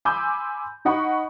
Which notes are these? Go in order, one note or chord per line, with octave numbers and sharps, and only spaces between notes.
G#5 B5 C6 D6 E6 G6
D#4 D#5 F#5 B5 C#6